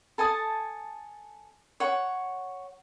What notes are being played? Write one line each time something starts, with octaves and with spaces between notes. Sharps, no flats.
A4 G#5 A5 D#6
C#5 F#5